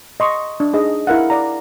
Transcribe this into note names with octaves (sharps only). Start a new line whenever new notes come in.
D#5 C6 C#6
D4
D#4 G#4 D#5
E4 A#4 F5 F#5
D5 A#5